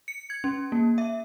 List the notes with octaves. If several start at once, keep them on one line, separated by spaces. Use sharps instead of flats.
C#7
G#6
C#4
A#3
E5